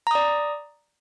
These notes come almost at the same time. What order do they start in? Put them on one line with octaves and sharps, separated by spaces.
A#5 D#6 D5